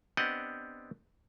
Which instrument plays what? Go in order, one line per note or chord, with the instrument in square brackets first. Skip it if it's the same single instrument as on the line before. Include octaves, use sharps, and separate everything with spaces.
[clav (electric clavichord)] B3 C4 D4 G4 D#5 F#5